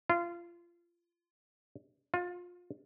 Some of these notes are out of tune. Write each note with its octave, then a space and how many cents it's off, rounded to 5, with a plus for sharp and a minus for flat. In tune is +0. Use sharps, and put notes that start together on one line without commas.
F4 -25
F4 +25